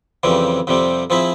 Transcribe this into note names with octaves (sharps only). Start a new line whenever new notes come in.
F2 C#3 E3 G3 C4
F2 C3 G3 C4
F3 C4 E4 G#4 E5